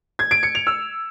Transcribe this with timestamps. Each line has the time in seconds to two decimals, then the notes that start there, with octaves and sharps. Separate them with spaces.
0.19 G#6
0.31 D7
0.43 C#7
0.55 F7
0.67 E6